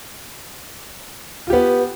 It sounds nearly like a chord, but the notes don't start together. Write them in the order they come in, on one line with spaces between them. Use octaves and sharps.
F4 G4 B3